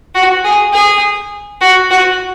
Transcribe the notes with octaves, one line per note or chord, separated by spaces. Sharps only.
F#4
G#4
G#4
F#4
F#4